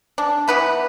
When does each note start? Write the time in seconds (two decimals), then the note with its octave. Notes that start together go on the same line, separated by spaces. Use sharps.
0.18 D4
0.48 E3 B3 B4